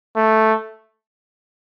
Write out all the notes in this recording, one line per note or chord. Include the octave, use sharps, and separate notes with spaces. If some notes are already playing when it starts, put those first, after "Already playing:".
A3